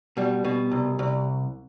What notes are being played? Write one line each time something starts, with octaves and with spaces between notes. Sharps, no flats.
B2 G3
B2
C2
C2